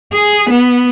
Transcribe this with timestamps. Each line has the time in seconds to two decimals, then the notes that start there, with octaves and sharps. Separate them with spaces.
0.13 G#4
0.50 B3